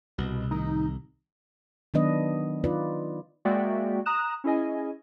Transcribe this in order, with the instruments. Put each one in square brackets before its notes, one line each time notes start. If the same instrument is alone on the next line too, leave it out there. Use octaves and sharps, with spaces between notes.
[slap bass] C2 [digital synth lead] B2
[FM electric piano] A2 D#3 A#5 [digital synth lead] D#4
[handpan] D#3 F#3 B3 D4 B4 D#5
D#4 F4 B4 D5
[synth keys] G#3 A#3 F#4 D5 E5 G5
A#5 D#6 F#6 E7
C#4 E4 G#4 D#5 G#5